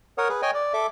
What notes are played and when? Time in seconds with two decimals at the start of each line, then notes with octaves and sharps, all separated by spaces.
0.18 A#4 C#5 F#5 D#6
0.29 G#4 B4
0.42 C#5 D#5 G5 G#5
0.54 D5
0.74 A4 E5 D6